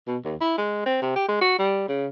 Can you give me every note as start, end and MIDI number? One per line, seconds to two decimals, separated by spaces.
0.07 0.18 47
0.25 0.36 39
0.41 0.55 64
0.58 0.84 56
0.86 0.98 60
1.02 1.13 48
1.16 1.26 67
1.28 1.37 56
1.41 1.55 66
1.59 1.88 55
1.88 2.07 49